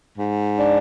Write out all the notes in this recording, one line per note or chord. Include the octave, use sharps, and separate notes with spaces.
G#2
D4